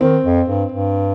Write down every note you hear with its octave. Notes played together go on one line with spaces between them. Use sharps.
D#3 C4
F2
G2
G2